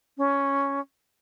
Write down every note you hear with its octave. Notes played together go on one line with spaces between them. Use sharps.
C#4